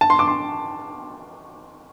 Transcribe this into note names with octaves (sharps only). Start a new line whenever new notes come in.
A5
C6
D6
C6